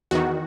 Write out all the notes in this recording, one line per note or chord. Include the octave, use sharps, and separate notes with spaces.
E2 D#3 F#4